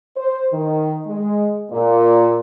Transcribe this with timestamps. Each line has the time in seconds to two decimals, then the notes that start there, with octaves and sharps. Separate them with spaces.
0.17 C5
0.53 D#3
1.06 G#3
1.70 A#2